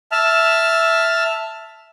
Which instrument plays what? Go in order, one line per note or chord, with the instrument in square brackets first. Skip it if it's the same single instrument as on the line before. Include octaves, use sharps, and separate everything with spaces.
[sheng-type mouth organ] E5 A5 F6